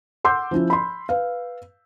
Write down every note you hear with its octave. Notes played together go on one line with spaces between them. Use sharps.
F#5 C6 D6 E6 G6
F3 C#4 E4 F4
B5 C6
B4 F5